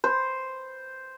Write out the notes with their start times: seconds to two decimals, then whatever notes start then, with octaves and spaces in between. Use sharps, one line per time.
0.04 C5